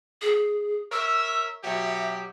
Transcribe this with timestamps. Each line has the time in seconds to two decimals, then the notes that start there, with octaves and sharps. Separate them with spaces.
0.22 G#4
0.92 A#4 C#5 E5 E6
1.64 B2 F#3 G4 E5